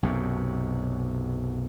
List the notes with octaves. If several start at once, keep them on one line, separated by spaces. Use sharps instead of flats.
B1 F#2 C3